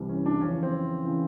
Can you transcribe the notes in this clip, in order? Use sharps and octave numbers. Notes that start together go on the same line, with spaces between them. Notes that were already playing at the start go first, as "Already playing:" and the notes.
Already playing: C2 C3 E3
C#4
D4
F2 C#3 E3 C#4
C4
C#3 E3